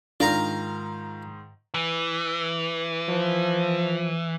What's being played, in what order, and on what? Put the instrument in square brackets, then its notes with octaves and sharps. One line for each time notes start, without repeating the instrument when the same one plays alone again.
[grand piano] G#2 D#3 [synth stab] D4 [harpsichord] F4 A#4 A#5
[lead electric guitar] E3
[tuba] F3